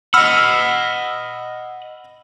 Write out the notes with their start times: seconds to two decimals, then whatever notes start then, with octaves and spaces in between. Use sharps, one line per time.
0.14 D#5 F#5 B5 E6 F6